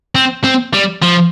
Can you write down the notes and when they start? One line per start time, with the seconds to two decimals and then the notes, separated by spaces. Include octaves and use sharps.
0.15 C4
0.44 C4
0.74 G3
1.02 F3